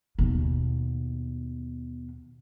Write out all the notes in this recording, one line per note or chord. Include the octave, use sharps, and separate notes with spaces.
D#2 B2